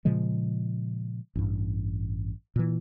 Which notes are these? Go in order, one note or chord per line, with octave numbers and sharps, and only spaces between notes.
A#2 C#3 F3 G#3
A1 G2
A#2 E3